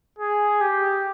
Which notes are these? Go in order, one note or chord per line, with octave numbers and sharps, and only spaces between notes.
G#4
G4